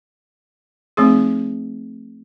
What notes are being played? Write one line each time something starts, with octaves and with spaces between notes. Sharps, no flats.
F3 A3 C4 D#4 G#4